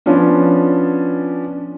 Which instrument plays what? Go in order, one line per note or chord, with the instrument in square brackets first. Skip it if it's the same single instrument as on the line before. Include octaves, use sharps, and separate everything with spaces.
[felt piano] F3 B3 C#4 D4